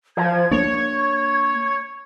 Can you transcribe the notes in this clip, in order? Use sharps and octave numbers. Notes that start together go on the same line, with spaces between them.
F3 G#6
A#3 D4 C#5